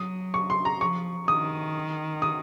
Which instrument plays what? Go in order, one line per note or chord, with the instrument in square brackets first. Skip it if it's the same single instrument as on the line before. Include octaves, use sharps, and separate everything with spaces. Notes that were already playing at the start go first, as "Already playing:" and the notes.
Already playing: [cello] F#3 [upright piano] D#6
[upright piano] C#6
C6
A#5
[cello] F3 [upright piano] C#6
[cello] D#3 [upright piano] D#6
[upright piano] D#6